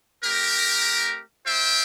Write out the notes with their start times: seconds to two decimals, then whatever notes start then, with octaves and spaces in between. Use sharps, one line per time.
0.24 A3 C4 G4 A#4
1.46 A#3 F4 C5 E5 G5